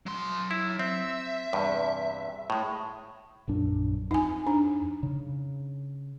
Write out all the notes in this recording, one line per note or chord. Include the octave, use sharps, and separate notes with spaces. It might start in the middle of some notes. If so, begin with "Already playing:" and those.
F#3 C6
E4
C4 E5
E2 G2 C3
A2 G#3
A#1 F#2 D4
F2 D#4 G#5
D4
C#3